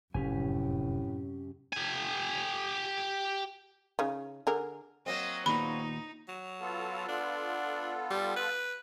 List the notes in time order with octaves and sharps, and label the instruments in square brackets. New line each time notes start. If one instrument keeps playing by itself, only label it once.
[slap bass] F1 [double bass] F#2 C3 [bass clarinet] A2 [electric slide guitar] C#4 G4 G#5
[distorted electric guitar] G4 G#5
[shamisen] C#3 D#4 C#5
D3 G#4 A#4
[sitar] F#3 A#3 C4 [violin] D#5
[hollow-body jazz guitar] D#2 A#2 B3 [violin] D#4 [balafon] B5
[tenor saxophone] F#3
[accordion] B3 F4 A4
[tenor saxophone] D4
G3
B4